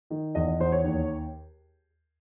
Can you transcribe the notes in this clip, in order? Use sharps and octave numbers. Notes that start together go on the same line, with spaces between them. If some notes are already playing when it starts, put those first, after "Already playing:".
D#3
E2 D#5
D#5
E2 C5
C#5
D#2